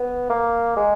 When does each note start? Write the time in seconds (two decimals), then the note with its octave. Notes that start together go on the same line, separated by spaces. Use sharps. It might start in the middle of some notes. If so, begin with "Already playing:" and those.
Already playing: B3
0.30 A#3
0.76 G#3